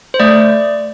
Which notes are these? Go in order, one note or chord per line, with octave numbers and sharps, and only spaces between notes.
C5
A3 D5